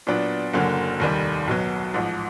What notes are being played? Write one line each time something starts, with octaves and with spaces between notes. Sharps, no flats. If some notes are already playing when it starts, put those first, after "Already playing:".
A#2 F#3 B3 D4
F#1 F#2 D3 F#3 A#3
F1 D#2 D#3 G3
B1 B2 F#3
A1 G#2 F3